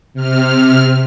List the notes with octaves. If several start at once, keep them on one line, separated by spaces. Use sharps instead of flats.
C3 F6